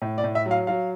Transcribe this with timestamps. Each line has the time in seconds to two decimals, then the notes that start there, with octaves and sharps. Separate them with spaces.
0.02 A2
0.18 D5
0.24 A2
0.35 E5
0.46 F#3
0.51 F5
0.67 F#3 F5